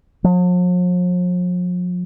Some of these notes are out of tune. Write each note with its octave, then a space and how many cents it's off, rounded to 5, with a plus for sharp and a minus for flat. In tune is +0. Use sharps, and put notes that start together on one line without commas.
F3 +45